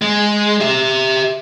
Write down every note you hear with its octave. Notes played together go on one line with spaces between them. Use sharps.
G#3
G4 E5